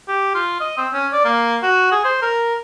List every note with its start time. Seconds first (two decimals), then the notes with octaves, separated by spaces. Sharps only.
0.08 G4
0.35 F4
0.60 D#5
0.77 C4
0.93 C#4
1.13 D5
1.25 A#3
1.63 F#4
1.92 G#4
2.04 C5
2.22 A#4